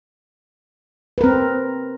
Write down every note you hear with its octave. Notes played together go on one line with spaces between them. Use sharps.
C4 A#4 B4